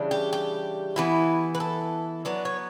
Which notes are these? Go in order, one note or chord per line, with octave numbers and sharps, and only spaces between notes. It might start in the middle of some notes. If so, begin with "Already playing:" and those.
Already playing: C#3 E3 G3 D4
G4
G4
E3 B3 E4
B4
A4
F#3 B3 D4
C#5